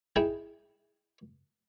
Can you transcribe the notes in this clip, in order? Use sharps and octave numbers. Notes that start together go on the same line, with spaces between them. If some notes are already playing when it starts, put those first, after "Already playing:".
D#4 E4 G#4 G5